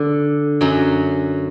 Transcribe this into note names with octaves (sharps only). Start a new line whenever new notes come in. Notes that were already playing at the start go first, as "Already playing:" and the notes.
Already playing: D3
F#2 F#3